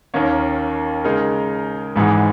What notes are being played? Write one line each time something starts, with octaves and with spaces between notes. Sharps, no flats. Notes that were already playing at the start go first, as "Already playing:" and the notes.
D#2 D#3 A#3 C#4
C#3 G#3 D#4 A#4
G#1 G#2 E3 G#3